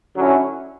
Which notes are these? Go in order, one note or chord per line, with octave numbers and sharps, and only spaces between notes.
D3 F#3 C#4 E4